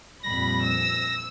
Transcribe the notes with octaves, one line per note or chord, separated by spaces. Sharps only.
F2 A#2 G3 B5 A#6
E6